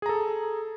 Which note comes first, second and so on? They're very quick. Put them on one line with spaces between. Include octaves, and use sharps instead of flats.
G#4 A#5 A4